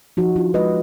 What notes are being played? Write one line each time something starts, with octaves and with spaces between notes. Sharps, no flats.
F3 D#4 F#4
D4 F4
G#3 B4 D#5